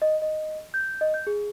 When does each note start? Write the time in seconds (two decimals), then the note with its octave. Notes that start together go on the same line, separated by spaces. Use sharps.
0.02 D#5
0.22 D#5
0.74 G6
1.01 D#5
1.14 G6
1.27 G#4